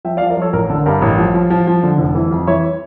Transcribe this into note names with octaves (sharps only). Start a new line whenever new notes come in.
F3 E5 G5
D5 F5
F3
A#4 D5
F3 A4 C#5
A1 A#4
D3 A4
G2 A#4
A1
F3
F3
F3
F3
D3
F1
E3
F2
E3 C#5 E5